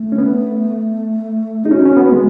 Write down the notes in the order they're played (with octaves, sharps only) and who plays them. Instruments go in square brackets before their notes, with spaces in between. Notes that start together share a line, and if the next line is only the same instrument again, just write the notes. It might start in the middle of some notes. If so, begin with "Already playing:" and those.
Already playing: [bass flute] A3
[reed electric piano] C#4
B3
[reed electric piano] D#4 [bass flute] G#4
[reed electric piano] C#4 [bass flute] F#4
[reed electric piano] C#4
B3
G#3